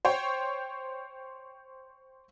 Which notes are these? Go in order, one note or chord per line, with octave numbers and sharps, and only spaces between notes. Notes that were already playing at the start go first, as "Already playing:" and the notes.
C5 C#5 G5